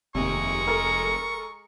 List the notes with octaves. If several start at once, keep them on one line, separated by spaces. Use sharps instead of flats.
F1 D#2 C3 G#3 A#5 C#6
A4 A#4